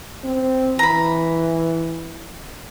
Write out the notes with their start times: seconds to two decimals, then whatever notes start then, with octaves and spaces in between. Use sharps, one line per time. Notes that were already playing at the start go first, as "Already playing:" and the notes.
0.24 C4
0.79 E3 A#5 B5